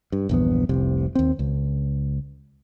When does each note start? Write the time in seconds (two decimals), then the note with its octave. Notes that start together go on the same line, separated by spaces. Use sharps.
0.12 G2
0.29 A#1 E2 G2 B3
0.69 F1 C2 C3
1.15 D#2 C4
1.39 C#2